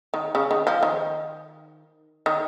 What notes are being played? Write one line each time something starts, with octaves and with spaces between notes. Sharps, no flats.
D#3
C#3
D#3
F3
D#3
D#3